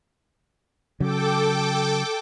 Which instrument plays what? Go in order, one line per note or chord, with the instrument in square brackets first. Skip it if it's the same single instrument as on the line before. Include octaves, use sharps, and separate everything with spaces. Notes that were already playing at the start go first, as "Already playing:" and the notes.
[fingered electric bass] C#3 F#3 [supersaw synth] A4 G5 D6